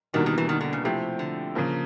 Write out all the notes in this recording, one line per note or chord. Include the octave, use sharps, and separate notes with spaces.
E2 B2 D#3 G3 A#3 D4
D#3
E3
D#3
D3
C#3
C3 F3 A3 C4 E4 G4
D3
C#3 F3 A#3